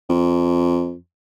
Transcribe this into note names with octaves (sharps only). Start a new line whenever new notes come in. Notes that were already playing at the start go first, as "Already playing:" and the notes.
F2